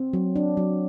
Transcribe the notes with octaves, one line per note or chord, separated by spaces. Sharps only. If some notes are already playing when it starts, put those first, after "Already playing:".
Already playing: C4
F#3
D4
F#3